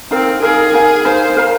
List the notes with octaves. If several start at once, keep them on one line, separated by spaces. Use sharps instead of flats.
C4 D#4 A#4 F5
D#4 G#4 A#4 F5
D#4 A#4 F5
D#4 A#4 C5 F5
A#4 F5 A#5